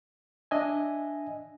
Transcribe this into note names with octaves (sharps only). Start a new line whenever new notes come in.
D4 D#5 E5 G#5